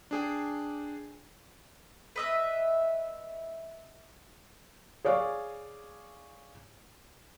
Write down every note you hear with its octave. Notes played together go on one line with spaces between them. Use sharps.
D4 G#4 G5
B4 D#5 E5
G#4 C#5 D5 F5